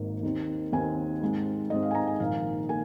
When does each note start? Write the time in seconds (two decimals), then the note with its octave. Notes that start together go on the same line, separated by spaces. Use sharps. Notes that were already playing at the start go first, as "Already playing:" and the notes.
Already playing: G#1 G#2 D#3 A#3
0.23 D#2 D#3 C4
0.72 D#2 D#3 C4 G#5
1.22 G#2 G#3 C4
1.70 G#2 G#3 C4 D#5
1.82 F5
1.91 G#5
1.95 A#5
2.07 G#5
2.20 A#1 G#2 D#3 A#3 F5
2.69 A#3 G#5